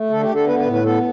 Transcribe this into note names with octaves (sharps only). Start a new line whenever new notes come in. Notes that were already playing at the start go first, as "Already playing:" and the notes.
Already playing: A3
D3 A4
G4
D3
A4
B3 B4
B4
A2
B4
B3 A4